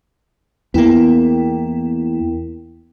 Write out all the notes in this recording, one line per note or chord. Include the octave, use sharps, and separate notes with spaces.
E2 A#3 B3 E4 G5